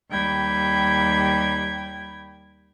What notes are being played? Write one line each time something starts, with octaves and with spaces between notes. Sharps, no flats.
D#2 G3 G5 B5 G#6